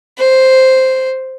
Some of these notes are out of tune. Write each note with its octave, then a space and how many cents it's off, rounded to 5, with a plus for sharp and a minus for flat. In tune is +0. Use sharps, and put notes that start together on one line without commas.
C5 +0